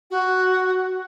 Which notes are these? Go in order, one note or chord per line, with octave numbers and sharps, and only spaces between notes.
F#4